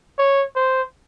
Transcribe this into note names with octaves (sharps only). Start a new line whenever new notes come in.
C#5
C5